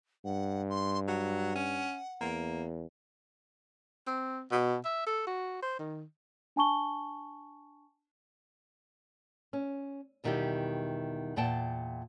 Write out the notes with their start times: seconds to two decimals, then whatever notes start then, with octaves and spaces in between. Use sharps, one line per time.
0.25 G2 F#5
0.69 C6
1.08 F#3 F#5
1.55 C#4
2.21 E2 A#3
4.07 C4
4.51 B2
4.85 E5
5.07 A4
5.27 F#4
5.62 C5
5.79 D#3
6.56 D4 G#5 A5 C#6 G7
9.53 C#4
10.24 E2 B2 D#3 G3 E4 G4
11.36 E2 A#2 F#5 G5 A5